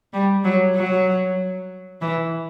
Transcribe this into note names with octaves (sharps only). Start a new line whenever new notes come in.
G3
F#3
F#3
E3